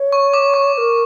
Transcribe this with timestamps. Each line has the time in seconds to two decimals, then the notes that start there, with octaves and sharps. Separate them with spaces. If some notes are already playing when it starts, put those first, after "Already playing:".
Already playing: C#5
0.12 C#6
0.34 D6
0.54 C#6
0.74 C#5
0.78 A#4